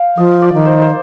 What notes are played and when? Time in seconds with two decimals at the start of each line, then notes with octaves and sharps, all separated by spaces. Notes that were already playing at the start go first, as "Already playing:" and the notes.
Already playing: F5 G5
0.17 F3 D#5
0.42 D5
0.53 D#3
0.65 C5
0.82 C5